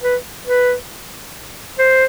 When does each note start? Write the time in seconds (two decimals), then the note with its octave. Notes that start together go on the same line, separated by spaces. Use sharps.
0.03 B4
0.47 B4
1.79 C5